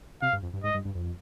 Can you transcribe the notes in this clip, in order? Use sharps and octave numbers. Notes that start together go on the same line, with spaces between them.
C3 F5
G2
F2
G2
G#2 D#5
G2
G2
F2